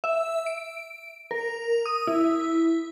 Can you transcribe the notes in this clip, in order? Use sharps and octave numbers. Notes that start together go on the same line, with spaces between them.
E5
D7
A#4
D#6
E4